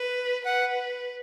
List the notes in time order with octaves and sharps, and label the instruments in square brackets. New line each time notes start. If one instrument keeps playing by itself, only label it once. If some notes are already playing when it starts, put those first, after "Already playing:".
Already playing: [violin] B4
[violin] B4 [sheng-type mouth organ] F#5